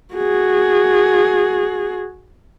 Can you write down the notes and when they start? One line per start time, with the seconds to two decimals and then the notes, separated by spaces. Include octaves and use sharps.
0.14 F#4 G#4